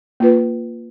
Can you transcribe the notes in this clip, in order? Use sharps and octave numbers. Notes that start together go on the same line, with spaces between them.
A#3 F4 B4